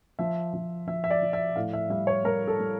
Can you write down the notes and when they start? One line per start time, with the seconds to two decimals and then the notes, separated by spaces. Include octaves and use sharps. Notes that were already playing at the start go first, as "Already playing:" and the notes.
0.19 F3 E5
0.53 F3
0.87 F3 E5
1.04 E5
1.10 D5
1.22 F3
1.33 E5
1.56 A2 F5
1.73 E5
1.90 G3 E5
2.07 C#5
2.24 G3 A#4
2.48 A4
2.59 G3